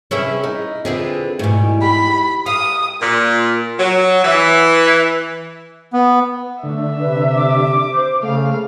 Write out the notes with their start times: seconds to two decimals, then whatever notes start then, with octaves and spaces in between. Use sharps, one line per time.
0.11 C3 C#4 E4 G#4 B4 E5
0.43 D#4
0.85 D3 C4 E4 F4 G#4 B4
1.39 G#2 B2 E3 G3 A3
1.82 G4 B5
2.46 F5 D#6
3.01 A#2
3.79 F#3
4.24 E3
5.93 B3
6.63 D3 A3 E5
7.00 C3 B4
7.36 D6
7.92 C5
8.23 C#3 A3 F5